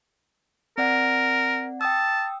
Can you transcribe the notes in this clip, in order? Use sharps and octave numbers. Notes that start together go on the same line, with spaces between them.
C4 A#4 D5 F#5
G5 A5 D#6 E6